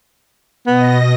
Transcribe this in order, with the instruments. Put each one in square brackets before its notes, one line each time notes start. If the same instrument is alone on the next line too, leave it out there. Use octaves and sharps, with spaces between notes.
[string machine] B2 D#5 A#6 [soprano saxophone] B3